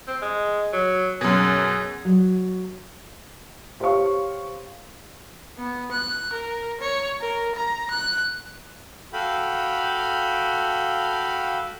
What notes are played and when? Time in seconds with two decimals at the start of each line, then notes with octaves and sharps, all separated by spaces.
0.08 C4
0.22 G#3
0.73 F#3
1.21 F#2 B2 G#4
2.05 F#3
3.80 G4 C5 C#5 F5 C#6
5.58 B3
5.91 F#6
6.32 A#4
6.80 C#5
7.21 A#4
7.55 A#5
7.90 F#6
9.13 F#4 A4 F5 G5 B5